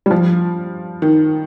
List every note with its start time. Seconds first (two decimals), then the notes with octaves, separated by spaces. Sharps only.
0.06 G3
0.11 F3
1.02 D#3